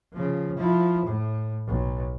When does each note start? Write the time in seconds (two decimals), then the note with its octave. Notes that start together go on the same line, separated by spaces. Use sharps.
0.13 C#3 F3
0.57 F3 E4
1.06 A2
1.67 B1